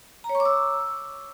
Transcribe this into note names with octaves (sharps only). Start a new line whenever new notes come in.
A#5
C#5
C#6
D6
E6